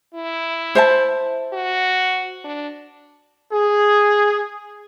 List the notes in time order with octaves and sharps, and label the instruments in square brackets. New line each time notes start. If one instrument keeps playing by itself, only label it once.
[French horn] E4
[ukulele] C5 E5 A5
[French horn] F#4
D4
[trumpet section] G#4